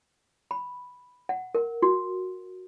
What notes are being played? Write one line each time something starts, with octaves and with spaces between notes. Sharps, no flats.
B5
F#5
A#4
F#4